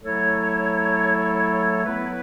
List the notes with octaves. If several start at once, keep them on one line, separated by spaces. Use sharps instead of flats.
F#3 A3 E4 A4 C#5
F#3 B3 E4 B4